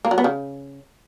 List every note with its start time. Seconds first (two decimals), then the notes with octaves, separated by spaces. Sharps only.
0.05 A#3
0.11 F#3
0.18 B3
0.24 C#3